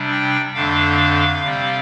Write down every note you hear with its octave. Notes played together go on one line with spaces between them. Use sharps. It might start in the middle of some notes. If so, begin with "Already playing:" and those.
Already playing: C3 G3 D4
G5
F2 D3 A3 D4 F5
C3 G3 C4